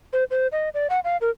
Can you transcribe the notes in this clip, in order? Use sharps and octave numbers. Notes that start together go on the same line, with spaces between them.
C5
C5
D#5
D5
F#5
F5
A#4